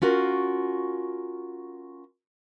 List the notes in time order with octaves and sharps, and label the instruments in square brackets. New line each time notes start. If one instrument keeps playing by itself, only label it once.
[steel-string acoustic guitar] C#4 F4 F#4 A#4